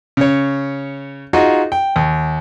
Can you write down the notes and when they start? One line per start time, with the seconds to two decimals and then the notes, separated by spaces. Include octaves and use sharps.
0.17 C#3 C#5
1.33 D#4 F4 F#4 G#4 D#5
1.72 G5
1.96 D#2